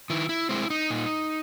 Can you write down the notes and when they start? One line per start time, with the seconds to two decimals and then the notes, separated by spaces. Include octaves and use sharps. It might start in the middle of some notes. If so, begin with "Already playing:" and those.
0.10 D#3 E4
0.29 E4
0.49 G#3 C4 E4
0.70 D#4
0.90 A#2